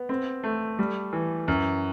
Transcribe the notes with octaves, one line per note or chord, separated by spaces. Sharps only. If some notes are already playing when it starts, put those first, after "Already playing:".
Already playing: B3
C4
A3
G3
E3
F#2